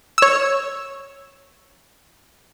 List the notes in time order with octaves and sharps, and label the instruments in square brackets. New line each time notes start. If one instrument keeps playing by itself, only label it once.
[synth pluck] C#5 E6